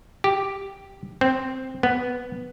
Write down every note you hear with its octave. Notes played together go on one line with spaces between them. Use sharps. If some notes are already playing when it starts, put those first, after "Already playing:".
G4
C4
B3